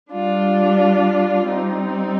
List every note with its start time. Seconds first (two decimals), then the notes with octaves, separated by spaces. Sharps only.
0.11 G3 D4 F4
1.48 G3 C4 D#4